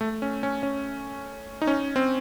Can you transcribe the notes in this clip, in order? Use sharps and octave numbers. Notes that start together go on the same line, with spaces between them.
A3
C#4
C#4
C#4
D#4
C#4
C4